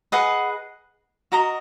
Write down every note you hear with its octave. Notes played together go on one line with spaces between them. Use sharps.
G#4 B4 D#5 F#5
F#4 A#4 D#5 A#5